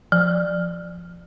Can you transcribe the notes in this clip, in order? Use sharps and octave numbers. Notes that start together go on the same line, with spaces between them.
F3